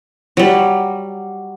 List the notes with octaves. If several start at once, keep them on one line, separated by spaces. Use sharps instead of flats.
F#3 G3